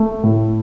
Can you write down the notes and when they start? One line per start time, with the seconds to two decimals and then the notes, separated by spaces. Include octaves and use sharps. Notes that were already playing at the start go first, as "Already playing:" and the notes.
Already playing: A3
0.23 A2